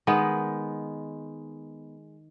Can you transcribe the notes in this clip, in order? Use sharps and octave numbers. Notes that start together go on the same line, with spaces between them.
D#3 G#3 B3